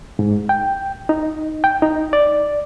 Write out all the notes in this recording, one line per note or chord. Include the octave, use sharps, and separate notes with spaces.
G#2
G5
D#4
G5
D#4
D5